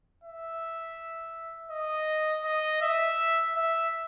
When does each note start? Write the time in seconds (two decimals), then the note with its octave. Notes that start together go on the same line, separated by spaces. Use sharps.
0.24 E5
1.71 D#5
2.45 D#5
2.82 E5
3.55 E5